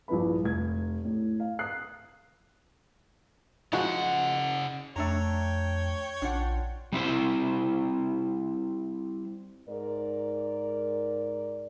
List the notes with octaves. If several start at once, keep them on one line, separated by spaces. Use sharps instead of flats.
A#1 G2 F3 E4 B4 B5
F1 G#6
A2
F5
D#6 F#6 C7
C#3 F3 G#3 F#4 F#5
F2 A3 D4 C#5 G5 A#5
A#1 D4 F4 F#5
G3 C4 E4 C5
G#2 A#4 D5